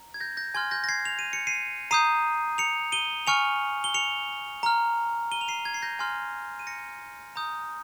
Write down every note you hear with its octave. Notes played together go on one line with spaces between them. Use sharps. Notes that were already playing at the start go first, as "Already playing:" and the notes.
Already playing: A#5
G#6
G6 A#6
G6 A#6
G#5 C6 F6 G#6
G6 A#6
A#6
G#6 C7
F7
D#7
C#7
C7 D#7
A#5 D#6 G6 C7 D#7
C#7 F7
D#7 G7
G#5 C#6 F6 C#7 F7
G7
C#7 F7
A#5 F6
D#7 G7
F7
C7 D#7
G#6
C7
G6 A#6
G#5 C6 F6
D#7
A#6 C#7
A#5 D#6 G6